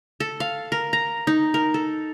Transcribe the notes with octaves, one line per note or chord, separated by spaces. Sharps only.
A4
F5
A#4
A#5
D#4
A#4
A4